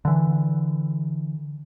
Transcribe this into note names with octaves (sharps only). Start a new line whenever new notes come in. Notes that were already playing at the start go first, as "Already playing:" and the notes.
D3 E3